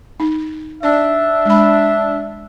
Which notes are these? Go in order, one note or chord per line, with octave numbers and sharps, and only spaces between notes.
D#4
D4 D5 E5
G#3 B5